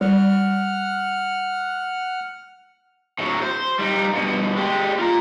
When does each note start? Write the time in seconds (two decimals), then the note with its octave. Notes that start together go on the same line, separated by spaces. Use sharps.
0.01 G3 F#5 F6
3.19 A2 F#3
3.42 C5
3.79 G3 D#4
4.13 G2 B2
4.56 G#3 G4
4.99 F4 A#5